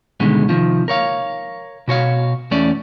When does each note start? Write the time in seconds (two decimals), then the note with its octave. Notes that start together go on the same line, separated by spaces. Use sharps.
0.20 D2 B2 D3 D#3 G3 G#3
0.49 C3 D#3 F3
0.88 A#4 C#5 F5
1.88 B2 F#4 C#5 F5
2.51 E2 A3 C#4 D5